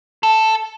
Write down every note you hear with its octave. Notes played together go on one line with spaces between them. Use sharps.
A4